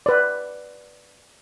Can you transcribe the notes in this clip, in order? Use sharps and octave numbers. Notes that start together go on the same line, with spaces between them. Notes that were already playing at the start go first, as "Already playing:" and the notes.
B4 D5